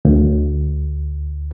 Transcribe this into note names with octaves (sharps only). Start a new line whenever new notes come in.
D2